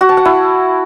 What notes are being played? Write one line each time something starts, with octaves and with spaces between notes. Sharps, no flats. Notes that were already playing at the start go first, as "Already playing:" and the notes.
F#4
A5
F#5
E4